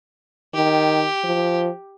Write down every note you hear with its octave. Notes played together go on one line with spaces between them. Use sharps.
D#3 G4
F3